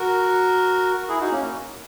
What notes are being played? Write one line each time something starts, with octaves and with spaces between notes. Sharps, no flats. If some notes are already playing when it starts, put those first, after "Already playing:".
Already playing: F#4 A#4
E4 G#4
D#4 F#4
A#3 C#4